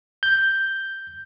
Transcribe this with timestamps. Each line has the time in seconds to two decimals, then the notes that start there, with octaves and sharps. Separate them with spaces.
0.23 G6